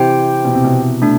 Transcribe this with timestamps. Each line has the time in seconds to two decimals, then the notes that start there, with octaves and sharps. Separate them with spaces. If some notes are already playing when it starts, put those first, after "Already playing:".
Already playing: C3 E3 G4 C5 G5
0.45 B2
0.54 C3
0.65 B2
1.02 A3 D4